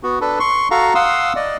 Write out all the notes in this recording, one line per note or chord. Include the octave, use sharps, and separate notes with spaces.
B3 F#4
D4 A4 B4
C6 C#6
F#4 A4 F5 A#5 C#6
F5 F#5 C6 D#6 E6
D5 D#5